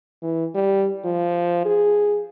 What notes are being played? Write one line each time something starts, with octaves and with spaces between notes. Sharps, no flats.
E3
G3
F3
G#4